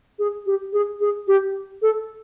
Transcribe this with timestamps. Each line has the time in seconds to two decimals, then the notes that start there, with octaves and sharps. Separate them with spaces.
0.19 G#4
0.46 G4
0.73 G#4
1.01 G#4
1.28 G4
1.82 A4